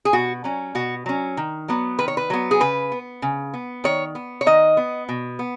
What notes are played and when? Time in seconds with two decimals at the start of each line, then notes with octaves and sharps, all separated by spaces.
0.05 G#4
0.13 B2 F#4
0.44 F#3 C#4
0.75 B2 F#4
1.06 F#3 C#4
1.37 D#3
1.68 F#3 B3
1.98 D#3 B4
2.08 C#5
2.17 B4
2.30 F#3 B3
2.51 G#4
2.60 C#3 B4
2.92 B3
3.22 C#3
3.54 B3
3.84 D#3 C#5
4.15 B3
4.41 C#5
4.46 D#3 D#5
4.77 B3
5.09 B2
5.39 B3